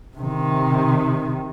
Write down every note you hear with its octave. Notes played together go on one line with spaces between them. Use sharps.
C3 D#3